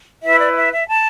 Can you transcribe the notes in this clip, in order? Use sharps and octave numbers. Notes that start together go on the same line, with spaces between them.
E4 B4 E5
D5
D5
E5
E5
A5